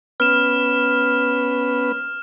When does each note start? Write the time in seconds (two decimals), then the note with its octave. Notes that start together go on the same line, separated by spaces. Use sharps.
0.20 B3 C#4 B4 F6 E7